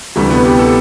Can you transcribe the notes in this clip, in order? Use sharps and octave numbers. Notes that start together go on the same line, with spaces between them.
D2 C3 E3 G3 A3
B3
G4
A4